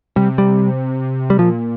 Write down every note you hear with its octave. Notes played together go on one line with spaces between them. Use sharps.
C3 G3
G3
G3
A#2 F3